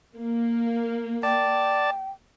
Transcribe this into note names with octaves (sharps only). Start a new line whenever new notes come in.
A#3
D5 G5 A5